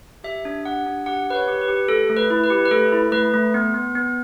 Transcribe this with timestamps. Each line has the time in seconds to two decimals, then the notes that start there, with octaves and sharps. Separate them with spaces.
0.24 G4 E5
0.45 D4
0.65 G4 F#5
0.86 D4
1.06 G4 F#5
1.27 G4 B4
1.35 C#5
1.48 G4
1.61 B4
1.68 G4
1.88 A3 A4
2.10 A3
2.17 B4
2.30 E4
2.44 B4
2.50 G4
2.65 B4
2.71 A3 A4
2.92 E4
3.12 A3 B4
3.34 A3
3.54 B3
3.74 B3
3.95 B3